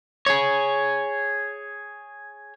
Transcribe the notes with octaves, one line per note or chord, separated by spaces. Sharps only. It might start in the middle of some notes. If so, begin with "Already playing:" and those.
G#4 C#5